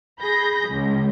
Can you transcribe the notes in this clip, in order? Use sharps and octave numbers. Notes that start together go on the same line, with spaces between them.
G#4 B5 G6 A#6
C#2